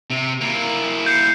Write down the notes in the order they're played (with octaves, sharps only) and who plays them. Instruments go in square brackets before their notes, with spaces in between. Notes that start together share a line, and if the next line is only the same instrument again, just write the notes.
[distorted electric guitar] C3
A#3 E4
[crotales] G6 C7 C#7